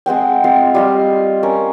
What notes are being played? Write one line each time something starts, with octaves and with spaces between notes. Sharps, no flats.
G#3 C4 F#5 G5
G#3 C4 F4
G3 F4 D#5
C#4 A#4